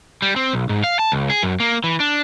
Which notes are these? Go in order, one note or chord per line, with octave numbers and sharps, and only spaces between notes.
G3
C4
B1
G#2
F5
A5
C#2
G#4
F#2
A#3
E3
D4